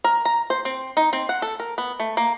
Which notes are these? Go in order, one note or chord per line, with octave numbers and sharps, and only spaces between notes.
A#4
A#5
C5
C4
D#4
C4
F#5
A4
A#4
B3
A3
A#3